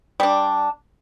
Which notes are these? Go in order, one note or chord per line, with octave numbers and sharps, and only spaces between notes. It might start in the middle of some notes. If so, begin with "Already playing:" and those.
G3 D4